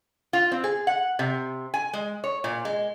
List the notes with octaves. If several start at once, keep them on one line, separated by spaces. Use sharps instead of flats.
F4
C4
G#4
F#5
C3
G#5
G#3
C#5
A#2
G#3